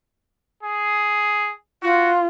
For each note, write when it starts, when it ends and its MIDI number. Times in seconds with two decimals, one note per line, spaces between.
0.63 1.52 68
1.83 2.27 65
1.83 2.10 66